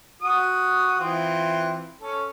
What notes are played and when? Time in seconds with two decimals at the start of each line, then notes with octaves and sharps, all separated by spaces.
0.22 F#4 D#6
1.00 E3 C4 F4
2.01 C#4 A4